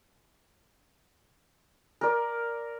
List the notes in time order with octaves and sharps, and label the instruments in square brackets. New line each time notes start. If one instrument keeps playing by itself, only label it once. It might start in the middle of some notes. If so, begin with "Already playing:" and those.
[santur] A#4 D5